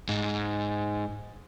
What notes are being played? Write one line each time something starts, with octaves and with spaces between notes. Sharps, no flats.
G#2